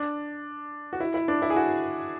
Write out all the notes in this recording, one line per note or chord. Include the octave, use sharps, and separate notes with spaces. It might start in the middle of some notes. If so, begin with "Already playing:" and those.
Already playing: D4
F#4
E4
E4
D4
E4
G#4
F#4